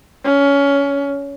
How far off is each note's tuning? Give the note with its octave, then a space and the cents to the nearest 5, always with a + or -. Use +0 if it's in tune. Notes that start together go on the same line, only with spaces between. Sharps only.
C#4 +20